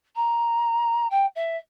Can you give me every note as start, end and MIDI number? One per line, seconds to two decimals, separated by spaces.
0.16 1.07 82
1.11 1.26 79
1.36 1.57 76